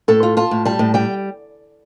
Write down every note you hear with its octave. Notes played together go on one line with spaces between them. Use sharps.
A2 A4
F4
F4 A5
A2
G3 A5
A2
G3 G5